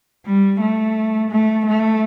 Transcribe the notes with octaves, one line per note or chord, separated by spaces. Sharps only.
G3
A3
A3
A3